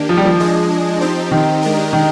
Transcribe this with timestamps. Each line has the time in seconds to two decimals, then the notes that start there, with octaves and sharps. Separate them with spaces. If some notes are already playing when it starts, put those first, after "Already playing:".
Already playing: D#3 A#3 D4 G4
0.09 F3
0.17 G3
0.25 F3
0.40 G#3 D4 G#4 D#5
1.01 C4 D#4 G4 C5
1.31 D#3
1.62 G#3 D4 G4 A#4 D#5
1.93 D#3